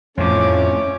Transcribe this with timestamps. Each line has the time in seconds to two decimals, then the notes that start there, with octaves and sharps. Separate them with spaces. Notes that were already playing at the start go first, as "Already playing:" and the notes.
0.17 F2 A2 F3 A3 C#4 D6